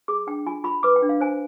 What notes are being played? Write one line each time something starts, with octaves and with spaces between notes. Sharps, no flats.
G#4 D6
D4 G5
F4 G#5
F4 B5
B4 D6
G5
D4
F5
C5 G#5